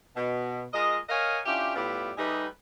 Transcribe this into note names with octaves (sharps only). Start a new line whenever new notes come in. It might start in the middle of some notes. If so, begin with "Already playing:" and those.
B2
G#3 F4 A#4 D#5
A#4 C#5 D#5 F5 F#5 G#5
C#4 D4 E4 F4 G4
A2 G3 B3 E4 F4 G4
G3 A3 D#4 G4 G#4 B4